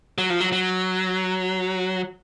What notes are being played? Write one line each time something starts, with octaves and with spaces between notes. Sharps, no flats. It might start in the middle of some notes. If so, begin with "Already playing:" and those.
F#3
F3
F#3
F#3